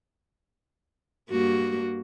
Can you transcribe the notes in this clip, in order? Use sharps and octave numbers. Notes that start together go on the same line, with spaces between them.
G2 A#3 F#4